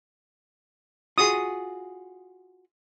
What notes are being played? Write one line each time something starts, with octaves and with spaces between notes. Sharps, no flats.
F4 F#4 G#4 D#6